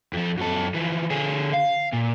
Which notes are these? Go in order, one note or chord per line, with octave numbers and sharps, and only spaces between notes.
F2 F3
F#2 A4
E3 F3
D3 G#4
F5
A#2